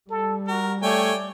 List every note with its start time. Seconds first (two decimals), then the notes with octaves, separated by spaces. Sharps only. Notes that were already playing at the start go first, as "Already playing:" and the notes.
0.10 G3 A4
0.48 F#4 A#4
0.83 A3 C#5 D5 G5 G#5